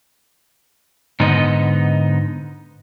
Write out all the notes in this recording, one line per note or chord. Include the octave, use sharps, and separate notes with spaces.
G#2 D3 B3 D#4 D#5